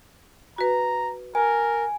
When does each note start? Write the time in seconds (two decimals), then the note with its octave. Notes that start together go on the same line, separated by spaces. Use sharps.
0.58 F#4 B4 A#5
1.35 A#4 G#5